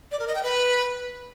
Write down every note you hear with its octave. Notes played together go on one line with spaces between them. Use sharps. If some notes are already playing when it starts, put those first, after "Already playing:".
D5
A#4
D#5
G5
B4